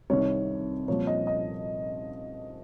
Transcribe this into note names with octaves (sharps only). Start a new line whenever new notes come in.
C2 C3 D#3 C#5
C2 A#2 F3 C#5
D#5
D#5